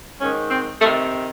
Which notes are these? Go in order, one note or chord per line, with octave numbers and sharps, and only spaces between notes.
G#2 D#3 C#4
C4
C3 D#3 A3